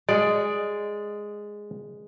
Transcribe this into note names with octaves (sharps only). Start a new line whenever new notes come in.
G#3 D5